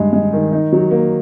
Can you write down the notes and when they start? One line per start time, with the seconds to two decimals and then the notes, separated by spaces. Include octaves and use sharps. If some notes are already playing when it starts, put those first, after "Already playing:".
Already playing: G2 G#3
0.13 G#3
0.33 D#3
0.52 D#4
0.72 F#3
0.91 A#3